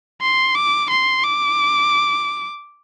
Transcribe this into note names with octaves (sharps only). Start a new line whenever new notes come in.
C6
D6
C6
D6